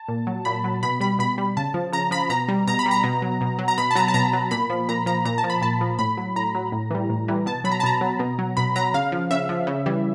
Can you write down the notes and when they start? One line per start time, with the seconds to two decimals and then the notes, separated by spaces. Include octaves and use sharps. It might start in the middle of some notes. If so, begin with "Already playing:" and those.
Already playing: A5
0.08 A#2
0.27 F#3
0.45 A#2 B5
0.64 F#3
0.83 B2 B5
1.00 G3 B5
1.19 B2 B5
1.38 G3
1.57 C#3 A5
1.74 F3
1.93 C#3 A#5
2.11 F3 B5
2.29 B2 A#5
2.48 G3
2.67 B2 A#5
2.79 B5
2.86 G3
2.91 A#5
3.04 B2
3.22 F#3
3.41 B2
3.59 F#3
3.68 A#5
3.78 B2 B5
3.91 A5
3.95 F#3 A#5
4.08 A5
4.14 B2 A#5
4.33 F#3
4.51 A#2 B5
4.70 F3
4.89 A#2 A#5
5.06 F3 A#5
5.25 A#2 A#5
5.38 A5
5.44 F3
5.50 B5
5.61 A#2 A5
5.81 F3
5.99 A2 B5
6.17 F#3
6.36 A2 A#5
6.55 F#3
6.72 A2
6.91 E3 G3
7.10 A2
7.28 E3 G3
7.46 B2 A5
7.64 F#3 B5
7.72 A#5
7.80 A5
7.83 B2 A#5
8.01 F#3
8.19 B2
8.39 F#3
8.57 B2 B5
8.76 F#3 A#5
8.94 C#3 F5
9.12 F3
9.31 C#3 E5
9.49 F3
9.67 C#3
9.86 E3 G3